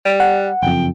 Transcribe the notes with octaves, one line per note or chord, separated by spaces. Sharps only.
G3
F#5
F#1 F2 G5